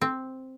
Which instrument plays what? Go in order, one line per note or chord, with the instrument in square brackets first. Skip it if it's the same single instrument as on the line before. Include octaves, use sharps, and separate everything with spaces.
[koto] C4